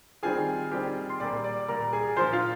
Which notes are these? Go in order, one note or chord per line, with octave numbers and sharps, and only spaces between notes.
D#3 G3 C4 F4 G#4 G#5
D#3 G3 C4 F4 G4 G5
C6
A#2 G3 A#3 D5 D6
D5 D6
A#2 G3 A#3 A#4 A#5
G#4 G#5
A#2 F3 A#3 F4 C5 C6
F4 F5